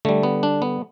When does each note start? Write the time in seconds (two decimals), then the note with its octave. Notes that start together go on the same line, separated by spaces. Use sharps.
0.05 D3 G3 A3
0.23 B3
0.43 D4
0.62 B3